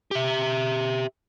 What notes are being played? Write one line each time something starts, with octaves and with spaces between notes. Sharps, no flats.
G4 E5